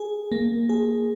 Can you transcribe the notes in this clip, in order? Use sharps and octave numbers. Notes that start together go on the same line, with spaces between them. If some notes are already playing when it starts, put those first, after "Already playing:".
Already playing: G#4
A#3
G#4